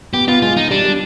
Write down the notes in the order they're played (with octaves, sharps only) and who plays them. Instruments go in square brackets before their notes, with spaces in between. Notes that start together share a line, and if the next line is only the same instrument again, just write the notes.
[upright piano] B3 [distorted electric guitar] G4
[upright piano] B3 [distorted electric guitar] F4
[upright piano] G#3 [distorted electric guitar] F4
[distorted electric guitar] D#4
[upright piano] G3 [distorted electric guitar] D4
[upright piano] G3